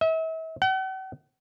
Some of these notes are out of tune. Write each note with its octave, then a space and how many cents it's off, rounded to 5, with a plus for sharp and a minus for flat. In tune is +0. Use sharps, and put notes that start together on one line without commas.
E5 -40
F#5 +45